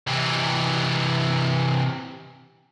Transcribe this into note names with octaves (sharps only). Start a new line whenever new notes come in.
C3 E3